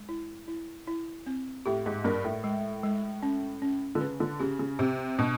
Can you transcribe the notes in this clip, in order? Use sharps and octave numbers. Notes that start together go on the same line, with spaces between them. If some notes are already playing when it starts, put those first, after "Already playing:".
Already playing: G#3
E4
E4
E4
C4
A2 G4
G#2
G2 A#4
A2
G#3
G#3
C#4
C#4
D3
C#3 B4
D3
C#3 G4
C#3
C3 G4
B2 D4